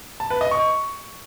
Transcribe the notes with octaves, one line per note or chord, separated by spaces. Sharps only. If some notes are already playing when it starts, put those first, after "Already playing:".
A5
B4
D#5
C#6